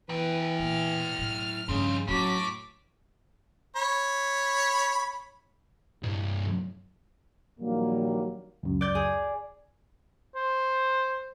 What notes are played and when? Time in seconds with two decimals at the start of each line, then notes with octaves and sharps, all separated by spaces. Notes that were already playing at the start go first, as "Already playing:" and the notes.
0.10 E3 E4 B4 G5
0.59 A#2 F6
1.18 A2 F#3
1.69 G2 C#3 F3 C4 D#4
2.08 A2 F#3 C#4 E4 D6 B6
3.76 C#5 B5
6.03 C2 G2
7.59 A#1 A#2 D#3 F#3 G3 A#3
8.63 C#2 F#2
8.81 D5 G6
8.95 G#4
10.35 C5